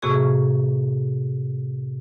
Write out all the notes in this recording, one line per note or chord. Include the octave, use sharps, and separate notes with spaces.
A2 C3 A#3 F#4 G#4 C#6